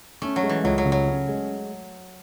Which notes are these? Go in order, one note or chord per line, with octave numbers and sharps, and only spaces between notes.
A3 C#4
F#3
G#3
E3
C#2 F#3
F#3
C#3
F#3
C#4
G#3